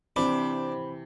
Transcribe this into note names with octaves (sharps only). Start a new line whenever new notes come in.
C3 E3 C4 D4 B5